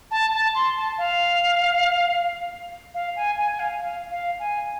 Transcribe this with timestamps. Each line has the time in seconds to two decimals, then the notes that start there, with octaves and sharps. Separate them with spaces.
0.11 A5
0.33 A5
0.55 C6
0.76 A5
0.98 F5
2.94 F5
3.16 G#5
3.38 G#5
3.52 G#5
3.59 F5
3.81 F5
4.11 F5
4.39 G#5